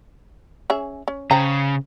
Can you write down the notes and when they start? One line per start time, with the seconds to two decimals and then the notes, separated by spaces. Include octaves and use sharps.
0.70 C#4 G#4 E5
1.08 C#4
1.31 C#3 C5 G5 A#5